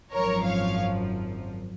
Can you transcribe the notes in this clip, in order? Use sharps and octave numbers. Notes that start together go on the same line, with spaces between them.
G#1 F#2 F3 A#4 C#5
C#5 F5